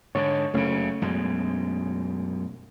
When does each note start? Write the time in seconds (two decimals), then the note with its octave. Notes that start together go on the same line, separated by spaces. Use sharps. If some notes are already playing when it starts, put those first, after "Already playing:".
0.15 G#2 D3 C#5
0.54 F#1 C#3 A3 C#4
1.02 F#2 B2 G#3